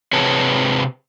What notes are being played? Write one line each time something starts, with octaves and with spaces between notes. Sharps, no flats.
C3 C4 G#4 B4 C#5 A5